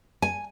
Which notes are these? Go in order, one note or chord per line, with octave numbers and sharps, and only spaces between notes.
G#5